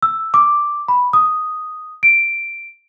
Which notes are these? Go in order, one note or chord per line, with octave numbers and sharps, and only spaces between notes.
E6
D6
B5
D#6
D7